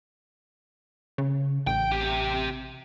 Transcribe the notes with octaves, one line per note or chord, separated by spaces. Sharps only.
C#3
A1 G5
C3 G4